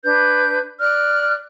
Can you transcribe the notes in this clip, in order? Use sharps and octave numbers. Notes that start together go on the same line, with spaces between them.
D4 B4 G6
D5 F6 F#6